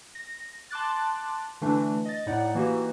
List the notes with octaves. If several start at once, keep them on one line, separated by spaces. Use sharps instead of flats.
A#6
A5 C6 D6 F#6 A6
D3 E3 A3 D4
D#5 A6
A2 D#4 D5 F#5
E3 A#3 D#4 F#4 G4